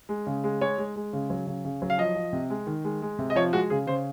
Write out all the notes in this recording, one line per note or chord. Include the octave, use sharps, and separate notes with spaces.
G#3
C#3
G#3
G#3 C#5
G#3
G#3
C#3
F#3
C#3
C#3
F#3
F5
F3 D#5
F3
C3
G#3
D#3
G#3
G#3
C3
D#5
F3 C#5
G#3 F#4
C#3 G#4
C#3 C5